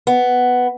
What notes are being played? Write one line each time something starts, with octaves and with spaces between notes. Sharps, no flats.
B3